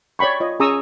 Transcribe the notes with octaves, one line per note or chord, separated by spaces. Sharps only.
C#5 D5 G5 B5 C#6
F4 C#5 D#5
C#4 G#4 A#5 C#6 D#6 E6